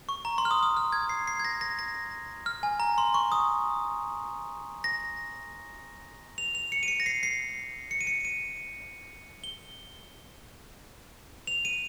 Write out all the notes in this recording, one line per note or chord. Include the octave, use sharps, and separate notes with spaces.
C#6
A#5
C6
F6
D#6
D#6
F6
G#6
C7
C7
G#6
A#6
A#6
A#6
F6
G#5
A#5
C6
C#6
D#6
A#6
F7
F7
C#7
D#7
C#7
A#6
C7
C7
C#7
D#7
C#7
D#7
G7
F7
D#7